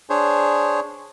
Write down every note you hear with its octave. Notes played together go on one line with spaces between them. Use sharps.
D4 G#4 C5 C#5